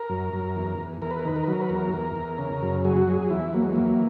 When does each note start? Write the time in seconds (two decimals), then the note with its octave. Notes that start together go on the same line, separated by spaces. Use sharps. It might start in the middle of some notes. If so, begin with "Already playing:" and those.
Already playing: A#4
0.09 F#2
0.33 F#2
0.56 E2
0.78 E2
1.02 E2 A#4
1.11 B4
1.19 A#4
1.25 D#3 B4
1.36 A#4
1.43 B4
1.47 F#3
1.53 A#4
1.61 B4
1.69 E2 A#4
1.93 E2 A#4
2.15 E2
2.38 C#3
2.62 F#2
2.85 F#3 G#4
2.97 F#4
3.08 F#3 G#4
3.30 E2 E4
3.53 F#3 A#3
3.63 G#3
3.73 E3 A#3